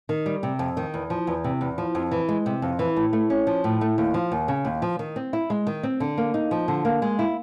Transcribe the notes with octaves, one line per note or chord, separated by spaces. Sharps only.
D#3
G3
C3
F2
D#3
E2
F3
E2
C3
E2
F3
F2
E3
G#3
C3
F2
E3
A2
A3
C#4
F3
A2
A3
D#2
F3
D#2
C#3
D#2
F3
D#3
C4
E4
G#3
D#3
C4
D3
A#3
D#4
F3
D3
A#3
G#3
E4